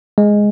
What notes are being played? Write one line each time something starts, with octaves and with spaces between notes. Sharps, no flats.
G#3